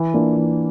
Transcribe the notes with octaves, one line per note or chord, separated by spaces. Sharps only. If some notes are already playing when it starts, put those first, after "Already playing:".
Already playing: E3
A#3 D4 F4
E3